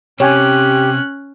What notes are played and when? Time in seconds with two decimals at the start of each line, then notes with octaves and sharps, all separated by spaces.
0.20 C3 C#4 G4 C#5 G5 G#5 F#6